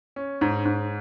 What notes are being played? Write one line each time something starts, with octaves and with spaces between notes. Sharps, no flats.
C#4
G#2
G#2